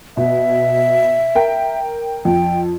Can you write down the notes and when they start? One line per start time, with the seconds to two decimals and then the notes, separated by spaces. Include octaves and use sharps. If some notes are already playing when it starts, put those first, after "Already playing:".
0.17 B2 E5
1.35 A#4 G5
2.25 F2 G5